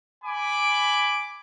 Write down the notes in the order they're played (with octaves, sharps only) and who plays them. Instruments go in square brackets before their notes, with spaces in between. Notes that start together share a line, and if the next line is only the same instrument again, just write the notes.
[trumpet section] G#5 B5 D6